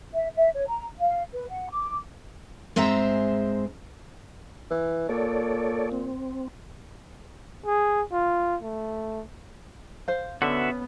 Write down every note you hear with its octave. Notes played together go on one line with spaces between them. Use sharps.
E5
E5
C#5
A#5
F5
B4
F#5
D6
G#2 G#3 C4 C5 E5 A#5
E3
A#2 A4 C#5 D5
C4
G#4
F4
A3
C5 F5
D3 B3 C#4 F#4 B4 E5